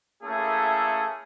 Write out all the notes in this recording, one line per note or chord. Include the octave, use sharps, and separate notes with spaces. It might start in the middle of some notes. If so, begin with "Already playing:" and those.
A3 A#3 C#4 E4 G#4 A4